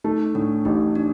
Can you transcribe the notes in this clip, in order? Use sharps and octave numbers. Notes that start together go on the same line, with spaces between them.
A3 D#4
A2 D4
A1 D#4
D4